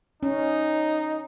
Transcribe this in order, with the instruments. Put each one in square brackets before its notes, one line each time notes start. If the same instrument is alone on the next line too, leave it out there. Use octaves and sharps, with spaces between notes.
[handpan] C#4 [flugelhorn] D#4